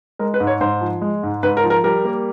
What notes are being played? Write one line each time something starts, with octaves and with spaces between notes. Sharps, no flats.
G#3 A#4
B4
G#2
C#5
G#2 C5
F3
G#3
G#2
G#2 B4
A#4
F3
A#4
G3 A#4
A#3